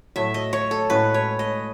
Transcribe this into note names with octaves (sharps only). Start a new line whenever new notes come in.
A2 F#3 A3 E5
D#5
C#5
A4
A2 G#3 C#4 F#4 B4
C#5
D#5